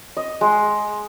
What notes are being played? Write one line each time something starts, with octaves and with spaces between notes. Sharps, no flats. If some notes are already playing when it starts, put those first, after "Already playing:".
D#5
G#3